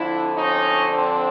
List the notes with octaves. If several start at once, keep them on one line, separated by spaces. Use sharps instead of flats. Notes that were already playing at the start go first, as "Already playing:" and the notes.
Already playing: F2 D3 F3 D4 E4
C#4 D#4
C4 D4